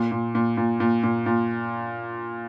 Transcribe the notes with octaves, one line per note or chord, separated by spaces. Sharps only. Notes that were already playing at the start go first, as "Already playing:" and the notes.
Already playing: A#2
A#2
A#2
A#2
A#2
A#2
A#2